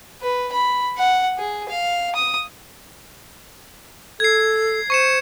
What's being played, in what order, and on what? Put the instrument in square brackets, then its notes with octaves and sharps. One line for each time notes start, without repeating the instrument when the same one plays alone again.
[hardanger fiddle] B4
B5
F#5
G#4
F5
D#6
[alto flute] A4 [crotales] G#6 C7
[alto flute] C5 [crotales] C#6 C#7 E7